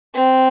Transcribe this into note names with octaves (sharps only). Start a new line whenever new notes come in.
C4